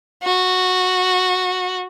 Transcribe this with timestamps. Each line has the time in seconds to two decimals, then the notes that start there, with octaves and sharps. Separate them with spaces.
0.23 F#4